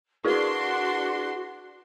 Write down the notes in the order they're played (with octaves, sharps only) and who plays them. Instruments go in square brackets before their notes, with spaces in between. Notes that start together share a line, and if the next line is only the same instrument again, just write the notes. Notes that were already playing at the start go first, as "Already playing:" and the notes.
[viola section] D4 C6 [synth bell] E4 G#4 B4 [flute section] F#4